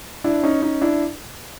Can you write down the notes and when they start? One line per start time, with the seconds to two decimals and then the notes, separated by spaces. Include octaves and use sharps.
0.24 D4 E4
0.43 C#4 D#4
0.62 C#4 D#4
0.81 D4 E4